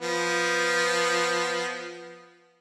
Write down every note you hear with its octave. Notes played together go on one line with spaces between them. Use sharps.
F3 B3